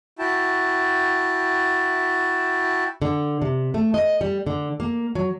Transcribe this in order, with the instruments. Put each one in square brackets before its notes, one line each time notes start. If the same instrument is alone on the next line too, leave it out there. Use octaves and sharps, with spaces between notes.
[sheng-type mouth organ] E4 F#4 G5 A5
[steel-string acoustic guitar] D3
C3
A3
D#5
G3
D3
A#3
F#3